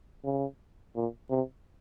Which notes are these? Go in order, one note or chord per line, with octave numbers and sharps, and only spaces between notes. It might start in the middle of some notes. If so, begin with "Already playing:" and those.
C#3
A#2
C3